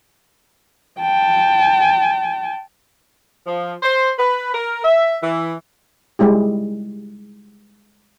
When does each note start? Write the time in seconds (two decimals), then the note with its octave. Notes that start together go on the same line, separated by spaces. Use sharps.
1.00 G5 A5
3.47 F3
3.83 C5
4.19 B4
4.54 A#4
4.84 E5
5.22 E3
6.19 G3 G#3 E4 G4